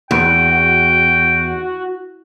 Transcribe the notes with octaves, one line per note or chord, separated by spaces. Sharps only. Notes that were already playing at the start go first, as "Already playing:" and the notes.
E2 F#4 G5